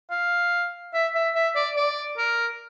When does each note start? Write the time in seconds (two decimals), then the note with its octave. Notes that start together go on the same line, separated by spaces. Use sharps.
0.11 F5
0.94 E5
1.15 E5
1.35 E5
1.56 D5
1.76 D5
2.18 A#4